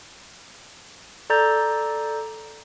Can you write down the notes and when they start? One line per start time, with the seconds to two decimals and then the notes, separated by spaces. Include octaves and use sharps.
1.30 A4 D5 A#5 G6 A6